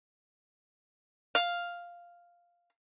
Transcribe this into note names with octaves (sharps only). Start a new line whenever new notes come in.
F5